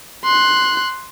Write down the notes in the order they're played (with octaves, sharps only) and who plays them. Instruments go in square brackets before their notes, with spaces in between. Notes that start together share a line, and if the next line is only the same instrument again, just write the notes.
[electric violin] C6 F#6